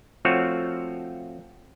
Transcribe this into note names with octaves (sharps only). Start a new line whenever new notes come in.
F3 A3 C4 F4 F#4 C#5